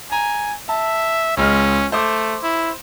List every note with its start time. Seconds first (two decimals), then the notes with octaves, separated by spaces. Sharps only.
0.12 G#5 A#5
0.69 E5 A5
1.37 C#2 G#3 C#4 F6
1.92 A3 C5 D6
2.43 E4